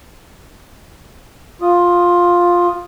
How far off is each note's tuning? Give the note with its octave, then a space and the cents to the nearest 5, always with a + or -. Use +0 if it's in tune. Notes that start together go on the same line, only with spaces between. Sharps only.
F4 +10 D#6 +0